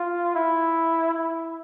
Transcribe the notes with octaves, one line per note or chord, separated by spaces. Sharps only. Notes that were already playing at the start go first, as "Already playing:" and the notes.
Already playing: F4
E4
E4